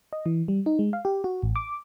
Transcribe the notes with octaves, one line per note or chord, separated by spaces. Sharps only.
D#5
E3
G3
D#4
G#3
F5
G4
F#4
A1
D6